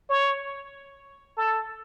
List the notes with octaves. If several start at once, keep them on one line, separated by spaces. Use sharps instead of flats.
C#5
A4